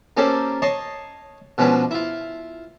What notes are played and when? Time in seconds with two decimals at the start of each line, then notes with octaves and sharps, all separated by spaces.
0.17 A#3 C#4 G4 A4 C5 D5
0.62 C#5 D#5 A5 C6 C#6
1.58 B2 F3 G#3 C#4 D4 B4
1.91 E4 F4